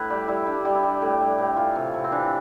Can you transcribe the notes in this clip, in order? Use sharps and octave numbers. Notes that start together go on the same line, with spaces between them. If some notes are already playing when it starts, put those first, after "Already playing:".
Already playing: A2 E4 B4
G3 G4
G3 E4
G3 D4
G3
E4
G3
A2
G3
A2
E3 F4
C3
C3
C4
E3 D4